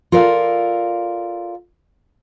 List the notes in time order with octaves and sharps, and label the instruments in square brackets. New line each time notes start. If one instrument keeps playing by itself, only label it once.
[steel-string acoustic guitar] F4 A4 A#4 D5 F5